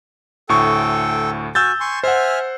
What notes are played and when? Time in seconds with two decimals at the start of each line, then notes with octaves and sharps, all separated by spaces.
0.49 D2 A2 A4 G5 C#6
1.55 F#4 G#5 E6 G6 A6
1.81 G#5 C6 C#6
2.03 C5 E5 F#5 G#5 F6